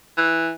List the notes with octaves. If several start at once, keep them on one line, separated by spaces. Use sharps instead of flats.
E3